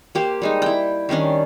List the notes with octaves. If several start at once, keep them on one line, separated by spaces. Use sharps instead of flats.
A#3 G4 C5
G3 G#3 D#4
E4 G5
D#3 G3 C#4 D4